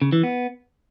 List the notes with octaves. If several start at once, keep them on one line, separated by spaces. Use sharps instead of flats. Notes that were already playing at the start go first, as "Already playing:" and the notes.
C#3
E3
B3